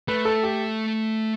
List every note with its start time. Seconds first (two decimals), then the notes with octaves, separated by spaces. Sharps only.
0.08 A3 B4
0.25 A4
0.43 G4